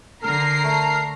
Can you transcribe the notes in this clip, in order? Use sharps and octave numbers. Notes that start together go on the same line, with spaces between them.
D3 A#4 A#5 F6 C7
A3